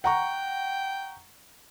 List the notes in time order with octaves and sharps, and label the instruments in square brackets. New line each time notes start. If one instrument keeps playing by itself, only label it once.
[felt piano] F#5 A#5 C#6 [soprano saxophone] G5